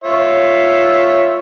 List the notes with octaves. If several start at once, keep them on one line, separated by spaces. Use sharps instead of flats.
F4 C#5 E5